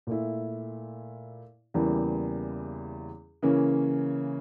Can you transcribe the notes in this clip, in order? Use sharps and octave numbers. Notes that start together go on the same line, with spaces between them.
A#2 A3 E4
E2 C#3 E3 G3 A#3
C#3 E3 A#3 C#4